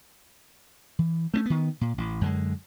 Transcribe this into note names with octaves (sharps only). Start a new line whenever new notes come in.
E3
A3 A#3 C#4
D#3 B3
A#2
A1
F#2 D3 G#3